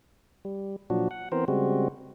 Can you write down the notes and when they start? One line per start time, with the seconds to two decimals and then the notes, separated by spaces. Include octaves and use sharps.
0.45 G3
0.90 A#2 F3 F#3 D4 F#4
1.11 F#5
1.32 E3 B3 C4 A#4 C5
1.48 C#3 G3 G#3 C4 F#4